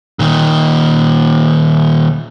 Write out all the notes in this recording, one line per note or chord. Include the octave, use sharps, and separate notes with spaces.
A#2 D#3